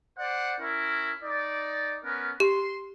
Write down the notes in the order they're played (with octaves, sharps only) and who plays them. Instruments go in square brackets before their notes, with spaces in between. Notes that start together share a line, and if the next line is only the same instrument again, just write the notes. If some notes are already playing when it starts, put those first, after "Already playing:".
[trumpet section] C5 D5 F#5
C#4 E4 A#4
D#4 D5
B3 C#4 A#4
[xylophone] G4 [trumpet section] C6